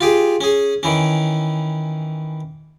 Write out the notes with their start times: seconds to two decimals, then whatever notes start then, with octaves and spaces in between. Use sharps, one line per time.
0.01 F4 G4 G#4
0.41 C#4 G#4
0.83 D#3 E3 C#4